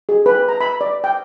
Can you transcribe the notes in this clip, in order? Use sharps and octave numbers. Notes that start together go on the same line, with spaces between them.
G#4
B4
A#5
B5
D5
G5